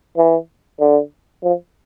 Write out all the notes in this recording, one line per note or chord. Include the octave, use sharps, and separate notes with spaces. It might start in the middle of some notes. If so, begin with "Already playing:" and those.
E3
D3
F3